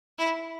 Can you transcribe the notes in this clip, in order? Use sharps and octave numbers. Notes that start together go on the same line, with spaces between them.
E4